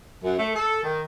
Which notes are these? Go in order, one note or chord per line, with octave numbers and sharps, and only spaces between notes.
F#2
A3
A4
D#3